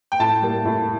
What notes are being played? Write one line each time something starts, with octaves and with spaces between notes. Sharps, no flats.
G5
A2 A5
G3 A#3
A2